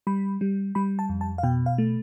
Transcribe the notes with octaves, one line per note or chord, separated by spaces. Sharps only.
G3 B5
G3
G3 B5
A5
F2
A5
F5
B2 G5
F5
A3